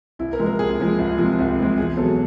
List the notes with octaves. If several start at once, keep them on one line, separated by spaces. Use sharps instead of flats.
C2 E4
A#4
C3 F3 G#3
A#4
C2 G#4
C3 F3 G#3
C2
C3 F3 G#3
C2
C3 F3 G#3
E2 G#4
B2 F#3 A4